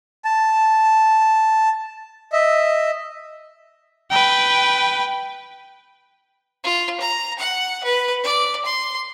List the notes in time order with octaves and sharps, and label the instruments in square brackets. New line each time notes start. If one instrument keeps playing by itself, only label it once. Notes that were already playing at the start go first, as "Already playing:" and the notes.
[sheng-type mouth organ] A5
D#5 E5
[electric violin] B4 G5
[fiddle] F4
A#5
F#5
B4
D5
C6